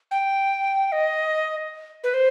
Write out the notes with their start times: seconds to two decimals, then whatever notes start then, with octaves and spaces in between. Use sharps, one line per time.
0.11 G5
0.92 D#5
2.04 B4
2.14 C5